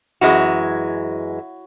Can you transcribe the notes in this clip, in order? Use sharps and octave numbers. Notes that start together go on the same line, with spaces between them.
F#2 E3 G#3 F#4